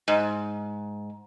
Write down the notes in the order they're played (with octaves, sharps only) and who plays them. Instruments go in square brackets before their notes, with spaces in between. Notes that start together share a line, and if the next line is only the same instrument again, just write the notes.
[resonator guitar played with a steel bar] G#2